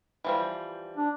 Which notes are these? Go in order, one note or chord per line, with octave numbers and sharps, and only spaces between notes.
E3 F3 G3
D4